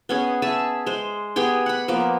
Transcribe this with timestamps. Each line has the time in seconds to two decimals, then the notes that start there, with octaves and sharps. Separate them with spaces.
0.09 B3 C#4 G#4
0.42 G#4 E5 A5
0.86 G#3 C5
1.36 B3 G4 G#4 G5
1.66 F#5 B5
1.88 F3 A#3 B3 D6